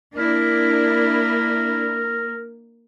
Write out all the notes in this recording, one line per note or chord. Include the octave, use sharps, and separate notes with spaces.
A#3 D4 E4 A#4